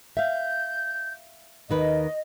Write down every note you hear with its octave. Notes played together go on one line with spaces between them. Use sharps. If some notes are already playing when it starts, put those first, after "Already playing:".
E5 F5 G6
D#2 D#3 B4 D#5